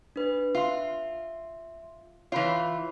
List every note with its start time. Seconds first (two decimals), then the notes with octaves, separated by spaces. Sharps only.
0.16 D4 B4
0.55 F4 E5 C6
2.32 E3 F4 C#5 B5